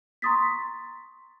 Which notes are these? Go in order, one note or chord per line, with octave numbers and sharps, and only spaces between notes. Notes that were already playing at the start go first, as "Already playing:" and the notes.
A#5 C6 C#6 D#6 A6 B6